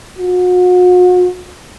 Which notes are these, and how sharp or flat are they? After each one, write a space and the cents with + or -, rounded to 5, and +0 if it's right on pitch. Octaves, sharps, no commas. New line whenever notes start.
F#4 -40